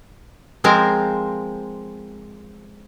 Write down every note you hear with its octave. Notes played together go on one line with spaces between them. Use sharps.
F3 G#3 C4 A#4 F5